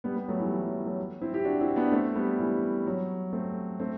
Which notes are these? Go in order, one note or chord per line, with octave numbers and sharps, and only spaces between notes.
G3 B3
G3 B3
F#3 A3
E3 G3
E3
F#3
F#3 A3
C4 E4
E4 G4
D4 F#4
C4 E4
B3 D4
A3 C4
G3 B3
E3 G3
F#3
A3 C4
A3 C4